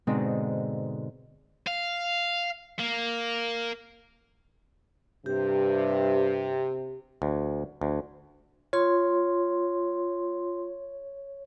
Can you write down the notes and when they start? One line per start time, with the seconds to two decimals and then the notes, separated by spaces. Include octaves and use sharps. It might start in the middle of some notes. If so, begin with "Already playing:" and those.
0.07 G#2 B2 D3 G#3 C4 D#4
1.67 F5
2.79 A#3
5.26 G2 C3 G4
7.22 D2
7.81 D2
8.73 F4 C#5 C6